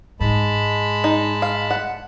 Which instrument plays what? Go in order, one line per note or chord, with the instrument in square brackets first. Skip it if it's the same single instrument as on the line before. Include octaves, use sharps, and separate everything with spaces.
[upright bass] G#2 [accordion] G#3 A5 B5
[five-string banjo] D#4
F5
F#5